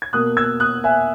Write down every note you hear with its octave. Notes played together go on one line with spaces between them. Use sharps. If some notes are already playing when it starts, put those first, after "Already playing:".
G#6
B2 A#3 D#6 F#6
E6 G#6
D#6 F#6
E5 G#5